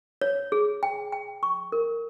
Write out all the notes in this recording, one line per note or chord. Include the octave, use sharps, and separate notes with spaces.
C#5
G#4
G5
G5
C#6
A#4